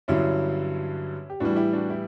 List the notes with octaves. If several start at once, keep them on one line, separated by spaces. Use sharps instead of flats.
G2 D3 F#3 C#4 E4
G4
A2 E3 G3 D4 F#4
E4 G4
D4 F#4
E4 G4